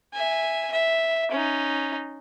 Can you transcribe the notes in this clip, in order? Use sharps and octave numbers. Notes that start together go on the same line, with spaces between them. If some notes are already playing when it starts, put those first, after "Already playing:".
E5 G#5
E5
C#4 D#4